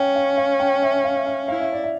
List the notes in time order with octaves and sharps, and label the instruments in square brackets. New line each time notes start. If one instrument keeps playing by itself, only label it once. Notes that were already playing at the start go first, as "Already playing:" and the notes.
Already playing: [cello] C#4 [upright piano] F5 G5
[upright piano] F5
F5
G5
E5
F5
E5
F5
[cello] E4 [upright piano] F5
[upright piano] E5
D5
E5